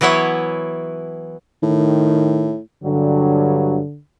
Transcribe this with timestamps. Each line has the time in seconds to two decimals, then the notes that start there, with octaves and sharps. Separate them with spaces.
0.01 E3 F#3 B3 E4 C#5
1.63 A2 D#3
2.84 G2 D3 F#3